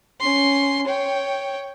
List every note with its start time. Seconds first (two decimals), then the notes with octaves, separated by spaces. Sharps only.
0.20 C#4 C6
0.87 C#5 G5